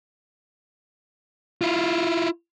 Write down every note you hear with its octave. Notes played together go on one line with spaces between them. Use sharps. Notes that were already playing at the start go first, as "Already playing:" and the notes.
E4 F4